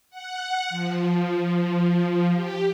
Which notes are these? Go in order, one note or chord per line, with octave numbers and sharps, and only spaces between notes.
F#5
F3
G4